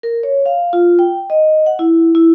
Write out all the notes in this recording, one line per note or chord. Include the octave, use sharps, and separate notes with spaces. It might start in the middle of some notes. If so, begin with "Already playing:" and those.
A#4
C#5
F5
F4
G5
D#5
F#5
E4
E4